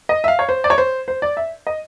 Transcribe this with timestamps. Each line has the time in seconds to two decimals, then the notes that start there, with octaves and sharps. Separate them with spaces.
0.09 D#5
0.24 E5
0.28 F5
0.39 C#5
0.49 C5
0.64 D5
0.70 C#5
0.78 C5
1.08 C5
1.22 D5
1.37 E5
1.67 D#5